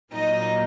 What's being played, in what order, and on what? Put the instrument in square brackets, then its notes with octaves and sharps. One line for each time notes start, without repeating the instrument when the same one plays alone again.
[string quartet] A#2 F#3 A#3 D#4 D#5